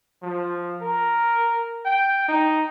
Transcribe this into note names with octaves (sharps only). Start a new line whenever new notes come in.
F3
A#4
G5
D#4